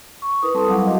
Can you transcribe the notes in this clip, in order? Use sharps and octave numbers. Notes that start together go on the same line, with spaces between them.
C#6
E4 A#4 B4 D#6
G3 C4 A4 A5 C6
F#3 E4 F5 F#5 D6
F#4 D#5 F5